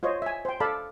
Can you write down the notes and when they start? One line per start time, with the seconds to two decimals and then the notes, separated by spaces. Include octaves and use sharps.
0.03 F4 C5 C#5 D#5
0.22 E5 G#5
0.45 C5 G5
0.60 A4 D5 F5 A5 B5